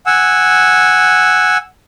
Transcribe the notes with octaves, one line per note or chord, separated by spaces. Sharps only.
F#5 G#5 E6